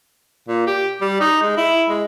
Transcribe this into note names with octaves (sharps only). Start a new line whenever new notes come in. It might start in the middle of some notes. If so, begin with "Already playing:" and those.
A#2
G4
G3
D#4
G#3
E4
G#3